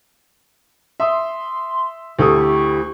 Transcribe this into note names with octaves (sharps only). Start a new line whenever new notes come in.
E5 C6 D#6
D2 E4 G4 A4 C#6 D#6